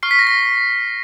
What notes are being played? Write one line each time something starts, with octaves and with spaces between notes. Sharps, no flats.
C#6 F6 C7
B6
A#6
B6